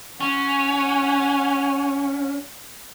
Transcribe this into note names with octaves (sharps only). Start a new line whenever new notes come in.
C#4 F#5 G#5